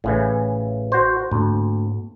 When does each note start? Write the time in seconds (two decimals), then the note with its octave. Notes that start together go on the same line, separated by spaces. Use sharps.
0.04 A1 A2 C#3 E3
0.92 F#4 C5
1.31 D2 G#2 A#3 C4